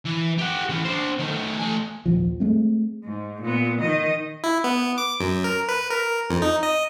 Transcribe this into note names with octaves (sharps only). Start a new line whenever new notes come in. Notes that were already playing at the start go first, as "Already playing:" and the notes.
E3
G4 F#5
E3 C#4
D4 C5
D#3 A3
A3 G#5
A#1 D#2 F3
G#3 A3 C4
G#2
A#2 B3
D#3 D#5
E4
B3
D6
F#2
A#4
B4
A#4
F2
D#4
D#5